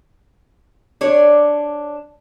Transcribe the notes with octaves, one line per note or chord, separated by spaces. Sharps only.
D4 C#5